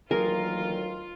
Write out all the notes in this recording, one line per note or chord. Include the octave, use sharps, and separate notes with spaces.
D2 D#3 E3 F#3 A#3 F4 G#4 A#4